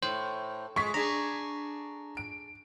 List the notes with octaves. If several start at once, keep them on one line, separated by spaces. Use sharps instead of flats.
A2 C5
G#3 C#6 B6
D4 G#4 A#5
D7